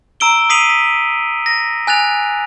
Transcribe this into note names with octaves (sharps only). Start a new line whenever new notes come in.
A#5 E6 D7 G7
D#6 B6 C7 D#7 F7 F#7
B6
A#6
G#5 F#6 A6 F7